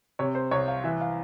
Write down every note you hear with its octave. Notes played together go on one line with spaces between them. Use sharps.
C3 C#5
C5
C2 C#5
F5
E3 E5
F5